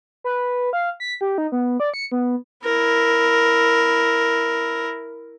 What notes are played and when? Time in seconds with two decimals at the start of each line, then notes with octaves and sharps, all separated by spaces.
0.24 B4
0.73 F5
1.00 B6
1.21 G4
1.38 D#4
1.52 B3
1.80 D5
1.94 C#7
2.12 B3
2.65 E4 A#4